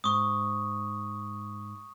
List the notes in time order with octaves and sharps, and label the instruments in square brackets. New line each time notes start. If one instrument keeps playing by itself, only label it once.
[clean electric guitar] G#2 [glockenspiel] C#6 D#6